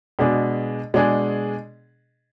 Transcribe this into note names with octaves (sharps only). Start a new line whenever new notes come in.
B2 G#3 D4 G#4
B2 G#3 D4 G#4